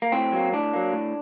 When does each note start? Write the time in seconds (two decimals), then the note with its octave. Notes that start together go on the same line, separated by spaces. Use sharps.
0.02 A#3
0.12 A2 C4
0.32 F#3 A#3
0.52 A2 D4
0.73 F#3 A#3
0.93 A2